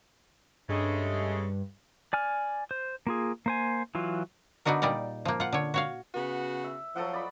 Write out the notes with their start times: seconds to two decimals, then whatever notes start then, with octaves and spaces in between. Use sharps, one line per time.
0.69 G2 C#3 G#3 A3
2.13 D5 G#5 F6
2.71 C5
3.07 A#3 F4 G#4
3.46 A#3 C5 G#5
3.95 E3 F#3 F4
4.65 D3 B3 D4 D#4 F#4 A#4
4.82 A#2 G3 D#4 A#4 D5
5.25 F3 A#3
5.40 F4 F#5
5.53 D3 C#5
5.74 F#4 C#5 F5
6.15 C#3 B3 F#4
6.64 E5
6.96 F3 F#3 A4 F#5
7.13 D5 D#5 B5